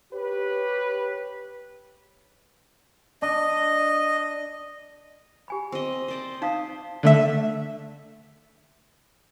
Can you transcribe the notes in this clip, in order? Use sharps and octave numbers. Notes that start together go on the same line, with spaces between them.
G4 B4 C#5
D4 D#5
G4 G#5 B5
C4 D#5
C5 D5 D#5
D#4 C5 F5 D#6
D3 A3 E5